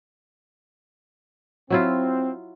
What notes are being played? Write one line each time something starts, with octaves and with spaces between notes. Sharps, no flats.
F#3 C4 E4 F4